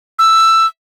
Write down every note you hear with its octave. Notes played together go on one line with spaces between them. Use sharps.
E6